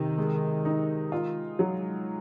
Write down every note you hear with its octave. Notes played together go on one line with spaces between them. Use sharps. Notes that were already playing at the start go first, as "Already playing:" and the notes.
Already playing: C3 D#3
G#3
D#4
G#3 F4
F#3